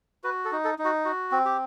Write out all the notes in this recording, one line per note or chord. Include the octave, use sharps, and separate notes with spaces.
F#4 B4
A4
D#4
A4
D#4
F#4
F#4
C4
G4